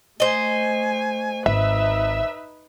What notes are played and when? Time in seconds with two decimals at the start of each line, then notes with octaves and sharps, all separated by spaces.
0.20 A3 C5 D#5 G#5
1.46 G#1 D#4 B4 E5